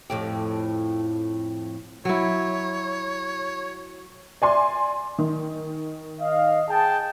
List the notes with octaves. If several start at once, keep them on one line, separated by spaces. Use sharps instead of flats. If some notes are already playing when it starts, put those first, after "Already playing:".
F2 A2 G4
F#3 E4 C#5
D5 G#5 C6
D#3
D#5 F5
G#4 G5 A5